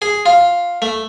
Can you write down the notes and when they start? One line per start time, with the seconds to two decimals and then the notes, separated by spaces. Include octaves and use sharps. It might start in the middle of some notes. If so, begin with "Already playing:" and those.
0.02 G#4
0.26 F4
0.82 A3